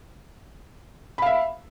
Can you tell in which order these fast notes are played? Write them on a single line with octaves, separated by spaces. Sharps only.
B5 F5 E5